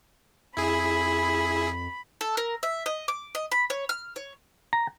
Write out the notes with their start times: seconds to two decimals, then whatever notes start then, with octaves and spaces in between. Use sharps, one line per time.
0.57 F2 E4 G#4 B5
2.21 A4
2.37 A#4
2.63 E5
2.86 D#5
3.08 D6
3.35 D#5
3.52 B5
3.70 C#5
3.89 F6
4.16 C#5
4.73 A#5